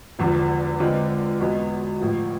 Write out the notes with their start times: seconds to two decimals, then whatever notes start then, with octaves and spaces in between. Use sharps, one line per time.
0.19 E1 E2 D3 F3
0.79 D3 G#3 C4 F4 B4
1.40 E2 B2 G#3 B3
2.00 A1 A2 F3